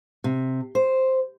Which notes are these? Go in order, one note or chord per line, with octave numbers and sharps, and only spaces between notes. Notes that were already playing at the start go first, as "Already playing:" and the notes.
C3
C5